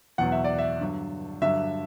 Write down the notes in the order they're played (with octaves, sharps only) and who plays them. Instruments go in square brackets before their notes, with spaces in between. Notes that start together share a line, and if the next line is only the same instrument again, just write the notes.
[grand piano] E2 B2 F#3 F#5
E5
D5
E5
G2 D3 F#3
G2 D3 F#3 E5